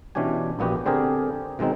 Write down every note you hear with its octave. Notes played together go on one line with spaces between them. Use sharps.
B2 E3 C#4 D4 G4 G#5
A#1 A#2 B3 F#4 G4
D3 C4 G4 G#4 A#4
B2 D#3 G#3 C4 D#4